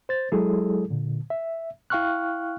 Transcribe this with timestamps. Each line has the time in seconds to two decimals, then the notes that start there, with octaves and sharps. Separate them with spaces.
0.09 C5 A6
0.32 F#3 G#3 E4 G#4 A4
0.90 A#2 D3
1.30 E5
1.90 E4 F5 G5 C#6 F6 F#6